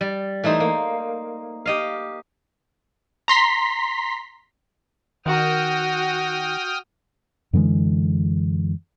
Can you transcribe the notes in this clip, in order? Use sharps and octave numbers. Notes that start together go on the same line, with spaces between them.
G3
E3 A3 D#4 C5
A#3
G4 D#5 F5
A#5 C6 B6
D#3 F#4 G5 D#6 F6
F#2 D3 E3 G#3